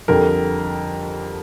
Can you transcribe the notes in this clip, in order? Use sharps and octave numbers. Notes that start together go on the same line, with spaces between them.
F2 D3 G3 A#4